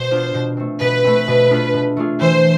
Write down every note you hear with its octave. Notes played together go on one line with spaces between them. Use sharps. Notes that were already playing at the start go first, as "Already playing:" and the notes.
Already playing: B2 C5
B3 D4 F4
B2
A3 C4
B2 B4
A3 C4
B2
A3 D4 F4 G#4
B2
A3 D4 F4 G#4
E3 C5